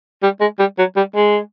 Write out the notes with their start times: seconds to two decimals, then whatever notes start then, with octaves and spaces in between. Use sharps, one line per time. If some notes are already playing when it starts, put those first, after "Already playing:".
0.23 G3
0.41 G#3
0.59 G3
0.79 F#3
0.96 G3
1.15 G#3